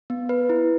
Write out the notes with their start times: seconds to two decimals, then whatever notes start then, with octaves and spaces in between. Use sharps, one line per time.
0.10 B3
0.29 B4
0.49 E4